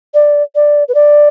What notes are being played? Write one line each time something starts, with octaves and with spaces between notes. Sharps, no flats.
D5
D5
B4
D5